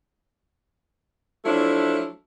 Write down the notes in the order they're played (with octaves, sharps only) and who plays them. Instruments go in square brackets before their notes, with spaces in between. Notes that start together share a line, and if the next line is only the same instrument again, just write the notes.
[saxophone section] F3 F#3 A3 D4 E4